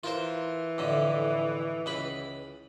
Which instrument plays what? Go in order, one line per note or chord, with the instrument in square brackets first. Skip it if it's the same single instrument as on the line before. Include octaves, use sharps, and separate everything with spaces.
[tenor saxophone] E3 [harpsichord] F4 A#4 C5
[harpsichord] F2 A2 D3
C#2 B4 B5